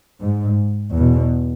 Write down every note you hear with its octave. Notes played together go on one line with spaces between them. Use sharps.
G#2
E2 B2